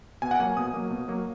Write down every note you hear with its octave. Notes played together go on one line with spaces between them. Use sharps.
B2 G#5
F#5
F#3 A#3 G#5
B2 D#6
F#3 A#3
B2
F#3 A#3